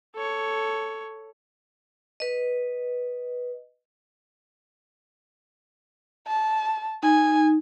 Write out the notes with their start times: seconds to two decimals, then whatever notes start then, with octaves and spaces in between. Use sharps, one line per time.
0.15 A4 C#5
2.20 B4 D#5
6.27 A5
7.03 D#4 G#5